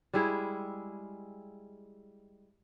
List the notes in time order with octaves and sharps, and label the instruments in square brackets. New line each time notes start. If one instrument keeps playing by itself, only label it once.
[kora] G3 G#3 E4 G#4